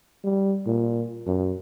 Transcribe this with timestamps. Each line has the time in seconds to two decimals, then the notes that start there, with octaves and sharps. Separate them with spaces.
0.24 G3
0.66 A#2
1.27 F#2